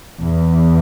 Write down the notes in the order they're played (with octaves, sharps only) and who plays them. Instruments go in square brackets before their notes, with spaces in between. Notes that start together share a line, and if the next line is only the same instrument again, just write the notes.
[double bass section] E2